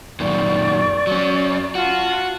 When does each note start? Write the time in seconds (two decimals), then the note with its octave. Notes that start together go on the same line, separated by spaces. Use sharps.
0.20 F#2 A#2 D#3 D5 C#6
1.07 F#3 C#4
1.75 F4 F#4 A5